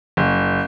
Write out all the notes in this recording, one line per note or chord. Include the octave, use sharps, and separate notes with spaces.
F#1